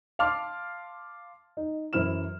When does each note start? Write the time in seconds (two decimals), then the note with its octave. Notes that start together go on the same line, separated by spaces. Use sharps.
0.19 F5 A5 C6 D6 F6
1.57 D#4
1.93 F#2 E3 E4 C5 F6 E7